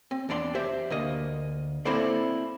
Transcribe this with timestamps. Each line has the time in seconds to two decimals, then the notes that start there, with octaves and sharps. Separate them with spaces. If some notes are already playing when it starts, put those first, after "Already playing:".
0.11 C4
0.29 E2 D4 D5 C6
0.55 G4 C5 E5
0.90 D2 A#3 D#5
1.85 A#3 C4 E4 A4 C5 D5